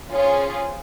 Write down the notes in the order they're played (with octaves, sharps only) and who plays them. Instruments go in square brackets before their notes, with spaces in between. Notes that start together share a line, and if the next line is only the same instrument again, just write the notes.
[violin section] C#4 F4 G#4 C5